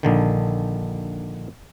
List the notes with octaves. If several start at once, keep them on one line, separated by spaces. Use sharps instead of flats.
A#1 D3 D#3